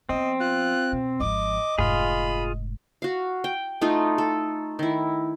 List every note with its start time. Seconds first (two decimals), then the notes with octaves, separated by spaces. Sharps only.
0.09 F3 B3 C4 D#5
0.40 F4 F#6
0.92 F2 B2
1.20 G#1 F3 D#5 D6
1.78 F1 G#2 F4 G#4 B5
3.02 F#4 F5
3.44 G5
3.81 A3 D#4 F4
4.18 A4
4.79 D#3 E4